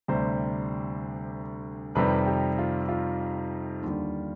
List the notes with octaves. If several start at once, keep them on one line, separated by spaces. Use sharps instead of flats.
D2 C3 G3 C5
F2 C3 D#3 G3 B4
G4
F4
F4
D#2 D3 G3